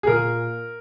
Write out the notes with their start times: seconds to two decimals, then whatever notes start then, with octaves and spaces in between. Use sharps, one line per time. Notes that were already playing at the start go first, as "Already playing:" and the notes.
0.03 G#4
0.07 A#2 A#4